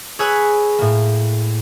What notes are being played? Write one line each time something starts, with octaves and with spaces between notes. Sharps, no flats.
G#4 B4 C#5 G#5 E6 F#6
A2 A#3